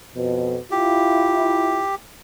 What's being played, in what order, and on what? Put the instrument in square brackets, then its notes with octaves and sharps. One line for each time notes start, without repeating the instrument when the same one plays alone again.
[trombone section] F2 B2
[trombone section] E4 F4 [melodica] G4